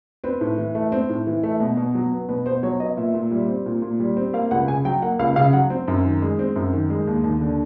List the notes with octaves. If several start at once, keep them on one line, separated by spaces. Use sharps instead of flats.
C4 B4
A2
E3
A3
C4
A2
E3
A3
B2
B2
F#3
B3
B2 B4
B2 C5
F#3 C#5
B3 D#5
A#2 E5
A#2
G3
C4
A#2
A#2
G3
C4
A#3 F5
C#2 F#5
C#3 G#5
F#3 G5
A#3 F#5
C#2 F5
C#3 F5
F#3 F#5
C4
F#2
D#3
G#3
C4
F#2
D#3
G#3
D#2
D#2
D3